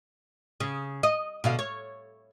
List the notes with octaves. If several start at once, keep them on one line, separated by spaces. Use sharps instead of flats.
C#3
D#5
B2 D3 F5
C#5